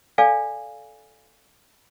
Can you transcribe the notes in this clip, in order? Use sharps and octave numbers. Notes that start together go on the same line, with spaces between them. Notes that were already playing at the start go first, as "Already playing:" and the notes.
A4 D5 F5 G#5